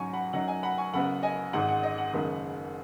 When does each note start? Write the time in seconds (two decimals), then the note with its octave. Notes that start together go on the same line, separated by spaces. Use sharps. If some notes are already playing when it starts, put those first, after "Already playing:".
Already playing: G#2 F#3 C#4 G#5 C#6
0.13 F#5 B5
0.33 F#2 F#3 D#4 F#5
0.48 D#5 G#5
0.63 F#5 B5
0.78 G#5 C#6
0.93 F#1 F#2 C#3 B3 F#5 B5
1.23 D#5 G#5
1.53 G#1 G#2 G#3 F#5
1.68 F#5
1.83 D#5
1.98 F#5
2.13 F#1 F#2 D#3 G#3 B3